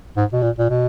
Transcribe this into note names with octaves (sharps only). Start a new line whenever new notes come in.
G#2
B2
A#2
A#2
B2